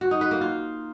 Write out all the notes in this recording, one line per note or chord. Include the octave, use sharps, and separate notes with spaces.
F#4
D#4
B4
A#3
F4